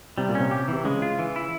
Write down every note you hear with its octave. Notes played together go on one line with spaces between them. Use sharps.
C3 G3
A#2
C#4
C3
G4
C3 E3
C#3 G#3
F4
E3
E4